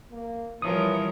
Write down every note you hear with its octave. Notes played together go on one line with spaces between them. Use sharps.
A#3
E3 F3 G3 A#4 C#5 D#6